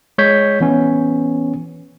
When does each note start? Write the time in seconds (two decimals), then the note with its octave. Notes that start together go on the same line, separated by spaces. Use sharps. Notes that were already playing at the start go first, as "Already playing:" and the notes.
0.18 G#3 C#5 G6 B6
0.60 E3 B3 C#4